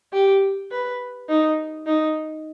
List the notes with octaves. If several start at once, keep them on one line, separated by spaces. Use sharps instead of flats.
G4
B4
D#4
D#4